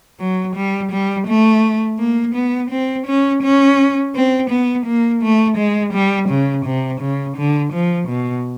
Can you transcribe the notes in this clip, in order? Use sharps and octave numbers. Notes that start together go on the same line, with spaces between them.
F#3
G3
G3
A3
A#3
B3
C4
C#4
C#4
C4
B3
A#3
A3
G#3
G3
C#3
C3
C#3
D3
F3
B2